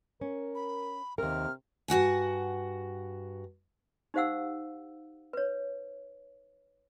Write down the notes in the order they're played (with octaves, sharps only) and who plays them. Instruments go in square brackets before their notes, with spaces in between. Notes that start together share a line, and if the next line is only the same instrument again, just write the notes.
[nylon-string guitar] C#4 [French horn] A#4
[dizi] B5
[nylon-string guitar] D#2 A#4 [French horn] C3 [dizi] F6
[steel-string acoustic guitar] G2 F#4 F#5 G#5
[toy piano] D#4 G4 C5 F5 F#5 E6
B4 C#5